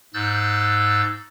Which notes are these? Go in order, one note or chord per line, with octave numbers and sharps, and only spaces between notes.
G#2 E6 F#6 G6 A6